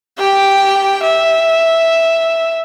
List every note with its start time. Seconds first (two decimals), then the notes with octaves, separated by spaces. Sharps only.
0.19 G4 G5
1.03 E5